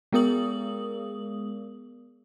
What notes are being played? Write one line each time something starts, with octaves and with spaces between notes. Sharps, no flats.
G#3 B3 G#4 A#4 D#6 F#7